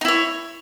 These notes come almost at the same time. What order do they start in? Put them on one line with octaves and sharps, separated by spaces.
D#4 E4 C#5